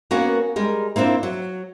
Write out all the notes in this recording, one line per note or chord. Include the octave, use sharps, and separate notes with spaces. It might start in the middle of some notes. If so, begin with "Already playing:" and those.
A#3 B3 C#4 F#4 A#4
G3 G#3 A#4
A#3 C4 D4 E4 F4
F#3